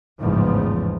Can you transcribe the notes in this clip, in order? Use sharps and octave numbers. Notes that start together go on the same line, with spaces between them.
A1 E2 G#2 C#3 F3